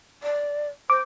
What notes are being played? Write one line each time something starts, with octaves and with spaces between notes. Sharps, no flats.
D5
C5 D6